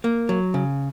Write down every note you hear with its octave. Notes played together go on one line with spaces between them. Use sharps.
A#3
F#3
C#3